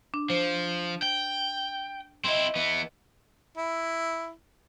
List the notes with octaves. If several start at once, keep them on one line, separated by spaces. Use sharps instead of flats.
D4
F3 C5
G5
C4 E4 D#5 C6
E3 B3
E4